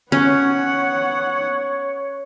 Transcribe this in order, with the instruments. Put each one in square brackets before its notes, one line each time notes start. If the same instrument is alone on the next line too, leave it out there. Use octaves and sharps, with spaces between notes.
[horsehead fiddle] B3 F#5 [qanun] C#4 [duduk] C#5